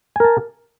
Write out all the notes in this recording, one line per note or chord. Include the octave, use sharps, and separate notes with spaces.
A#4 G#5 A5